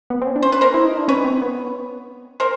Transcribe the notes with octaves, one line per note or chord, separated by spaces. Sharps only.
B3
C4
C#4
D4
C#4 C5
B4
A#4 C5
E4
D#4
D4
C#4 B4 C#5
C4
B3
A#4 C5